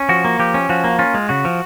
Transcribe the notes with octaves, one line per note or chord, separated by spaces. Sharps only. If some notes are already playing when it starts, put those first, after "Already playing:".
Already playing: C#4
F3 F#4
A#3
F3 G4
C#4
F3 F#4
A#3
C#4 F4
G#3
C#3 F#4
F3